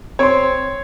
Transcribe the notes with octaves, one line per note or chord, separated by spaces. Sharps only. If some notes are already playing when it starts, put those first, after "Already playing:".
C4 C#5 C6